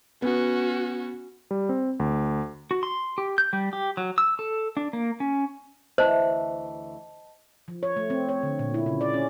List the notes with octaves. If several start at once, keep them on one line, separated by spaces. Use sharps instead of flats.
B3 C#4 F#4
G3
C4
D2
F#4
C6
G4
G6
G3
G4
F#3
E6
A4
D4
A#3
C#4
D2 E3 C5 D#5 E5 A5
F3
C#5
A3
C4
C#5
D3
A#2
E4
C#3
D5
C#4